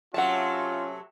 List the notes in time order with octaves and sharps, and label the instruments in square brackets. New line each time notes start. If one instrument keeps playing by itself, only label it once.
[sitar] C3 F#3 A3 [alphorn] C#4 [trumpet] F4 [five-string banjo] F#5 A5